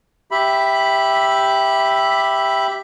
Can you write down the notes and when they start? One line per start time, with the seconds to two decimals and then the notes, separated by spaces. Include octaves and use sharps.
0.31 G4 E5 B5